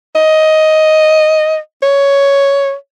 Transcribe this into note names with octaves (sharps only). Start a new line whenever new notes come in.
D#5
C#5